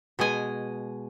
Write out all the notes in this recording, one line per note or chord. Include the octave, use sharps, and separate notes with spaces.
B2 G#3 D#5 G#5